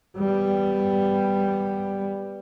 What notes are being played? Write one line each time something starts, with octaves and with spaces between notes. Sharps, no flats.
G3 B3